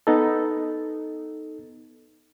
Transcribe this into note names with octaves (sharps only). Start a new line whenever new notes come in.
B3 D#4 A4